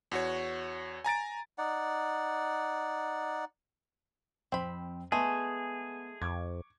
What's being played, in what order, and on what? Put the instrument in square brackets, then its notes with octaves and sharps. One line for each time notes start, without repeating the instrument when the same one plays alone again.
[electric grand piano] E2 F#4 C#5
G#5 A#5 A6 D7
[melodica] D#4 D5 F#5
[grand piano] F2 [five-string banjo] C4 B5
[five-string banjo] G#3 A3 [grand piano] B3 [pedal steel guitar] G#4
[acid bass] F2 [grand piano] C#6 D6 G#6